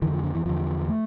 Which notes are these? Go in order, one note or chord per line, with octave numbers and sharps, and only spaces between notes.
F2 D3 E3
F3
D3
E3
E2 D3 F3
A3